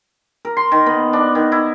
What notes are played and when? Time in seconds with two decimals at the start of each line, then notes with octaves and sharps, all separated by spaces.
0.45 A#4
0.57 C6
0.72 D#3
0.86 B3
1.13 D4
1.35 D#3
1.52 E4